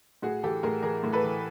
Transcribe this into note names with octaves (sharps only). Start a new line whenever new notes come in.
A2 F#4 G#4
E3 G4 A4
A2 G#4 A#4
E3 G#4 A#4
A2
A4 B4
E3